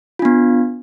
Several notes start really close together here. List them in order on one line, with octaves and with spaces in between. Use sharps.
F4 D4 B3